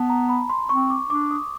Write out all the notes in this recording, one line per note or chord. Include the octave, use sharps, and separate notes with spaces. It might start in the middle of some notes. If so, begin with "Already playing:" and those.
Already playing: B3 A5
A#5
B5
C6
C4 C#6
D6
D4 D6
D#6